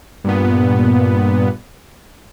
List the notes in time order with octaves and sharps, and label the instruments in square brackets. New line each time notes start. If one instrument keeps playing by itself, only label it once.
[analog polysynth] G2 A#2 B3